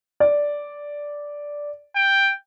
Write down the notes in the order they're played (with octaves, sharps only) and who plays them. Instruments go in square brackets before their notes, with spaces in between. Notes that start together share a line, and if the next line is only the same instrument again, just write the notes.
[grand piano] D5
[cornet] G5